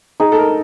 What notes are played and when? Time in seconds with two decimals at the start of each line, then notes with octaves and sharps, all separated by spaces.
0.20 D#4 G#4
0.32 A4
0.39 A#4